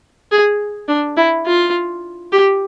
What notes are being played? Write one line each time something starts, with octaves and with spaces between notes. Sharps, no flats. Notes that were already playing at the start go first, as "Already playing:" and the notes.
G#4
D4
E4
F4
G4